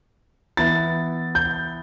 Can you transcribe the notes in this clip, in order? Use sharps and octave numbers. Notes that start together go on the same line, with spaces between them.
E3 B3 E4 A6
G6